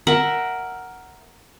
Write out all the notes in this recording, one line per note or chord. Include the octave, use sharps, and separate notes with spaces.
A#4 E5 F#5